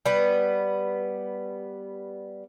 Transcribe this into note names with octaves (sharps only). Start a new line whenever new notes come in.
G3 B3